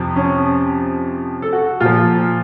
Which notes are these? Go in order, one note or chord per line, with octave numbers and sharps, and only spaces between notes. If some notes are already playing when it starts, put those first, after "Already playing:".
Already playing: F2 C3 F3
C#4
A4
F#4
A#2 F3 F4